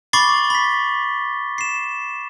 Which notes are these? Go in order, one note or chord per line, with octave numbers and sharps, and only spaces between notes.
B5 C#6 D6 A6 C7 G7
B5 B6
C7 E7